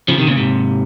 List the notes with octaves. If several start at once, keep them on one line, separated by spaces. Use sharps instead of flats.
C#3 F3
C3 D#3
A#2 C#3
G#2 C3